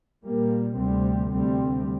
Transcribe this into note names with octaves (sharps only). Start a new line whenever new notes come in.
A#2 G3 A#3
D2 C3 G3 C4
D2 C3 G3 C4